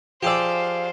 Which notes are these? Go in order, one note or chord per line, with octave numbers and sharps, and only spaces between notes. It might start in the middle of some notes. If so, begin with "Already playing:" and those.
F3 G4 G#4 C5 D5 F5 E6